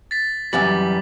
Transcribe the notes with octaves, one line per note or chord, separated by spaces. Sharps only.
A6 B6
F#2 E3 G3 D6 A6 F#7